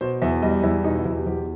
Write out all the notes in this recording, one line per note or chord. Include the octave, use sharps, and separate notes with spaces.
B2 C5
E2 E5
G3 D#5
E2 E4
B2 D#4
E4
E2 E4
G4
E2 G4